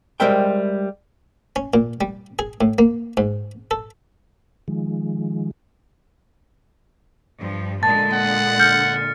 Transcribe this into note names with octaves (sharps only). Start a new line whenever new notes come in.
G3 G#3 A#4 C5 E5 G5
C#4
A#2
G3
G#4
A2
A#3
G#2
A4
D#3 F3 G#3
G2 F3
A#2 D3 G#3 A5 A6
F#5
F6 G6 C#7